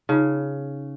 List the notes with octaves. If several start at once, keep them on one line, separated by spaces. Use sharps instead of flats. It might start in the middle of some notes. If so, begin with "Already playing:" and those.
C#3 D#4 F4